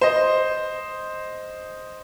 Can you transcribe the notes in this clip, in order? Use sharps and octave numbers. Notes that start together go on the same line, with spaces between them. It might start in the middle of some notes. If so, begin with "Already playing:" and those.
C5 D#5